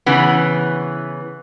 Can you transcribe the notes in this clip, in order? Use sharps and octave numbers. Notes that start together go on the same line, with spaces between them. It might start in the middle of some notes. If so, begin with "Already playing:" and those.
C#3 E3 B3